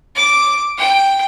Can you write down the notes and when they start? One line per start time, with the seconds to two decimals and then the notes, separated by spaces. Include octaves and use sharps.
0.15 D6
0.77 G5